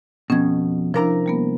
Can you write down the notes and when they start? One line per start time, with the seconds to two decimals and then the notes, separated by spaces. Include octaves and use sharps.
0.30 F2 B2 C#4 G#6
0.94 C3 F3 D4 E4 A#4 A#5
1.26 G3 A#3 B3